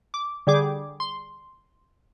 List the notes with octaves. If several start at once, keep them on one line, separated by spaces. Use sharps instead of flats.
D6
D3 G3 G#4 D6
C6